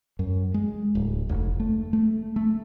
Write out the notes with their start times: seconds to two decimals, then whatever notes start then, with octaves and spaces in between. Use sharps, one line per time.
0.19 F#2
0.54 G#3
0.95 D1
1.29 F1
1.60 A3
1.93 A3
2.36 A3